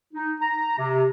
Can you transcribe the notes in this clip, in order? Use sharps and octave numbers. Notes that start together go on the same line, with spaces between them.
D#4
A#5
C3